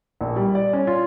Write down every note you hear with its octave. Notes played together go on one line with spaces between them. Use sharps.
A#1
G3
D5
C#4
F4